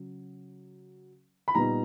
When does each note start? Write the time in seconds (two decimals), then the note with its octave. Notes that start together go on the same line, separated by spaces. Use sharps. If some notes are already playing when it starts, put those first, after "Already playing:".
Already playing: C#3 F#3
1.48 B5
1.55 A#2 G3 B3 D#4 A#5